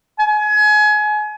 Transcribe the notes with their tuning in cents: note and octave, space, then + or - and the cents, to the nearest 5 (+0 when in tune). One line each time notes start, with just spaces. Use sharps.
G#5 +30